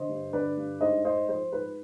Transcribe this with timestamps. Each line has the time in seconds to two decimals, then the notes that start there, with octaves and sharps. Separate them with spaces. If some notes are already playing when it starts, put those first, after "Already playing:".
Already playing: D3 C5 D#5
0.09 G2
0.33 D3 B4 D5
0.57 G2
0.81 G#2 C5 D#5
1.05 G#2 C5 D#5
1.29 F3 C5
1.52 G#2 B4